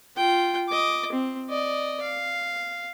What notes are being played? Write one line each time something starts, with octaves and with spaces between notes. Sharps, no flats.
F4 G5
D#5 D6
C4
D5 D#5
F5